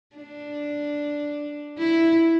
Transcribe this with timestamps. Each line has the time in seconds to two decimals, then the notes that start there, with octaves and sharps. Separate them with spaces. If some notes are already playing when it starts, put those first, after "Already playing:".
0.16 D4
1.79 E4